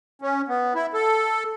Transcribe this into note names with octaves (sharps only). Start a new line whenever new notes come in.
C#4
B3
E4
A4